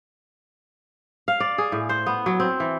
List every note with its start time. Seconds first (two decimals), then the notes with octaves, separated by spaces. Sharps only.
1.28 F5
1.40 D5
1.58 G#4
1.72 A2
1.89 C5
2.06 B3
2.26 F#3
2.40 C4
2.60 E3